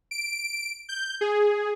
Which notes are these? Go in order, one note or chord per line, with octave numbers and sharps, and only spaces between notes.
D7
G6
G#4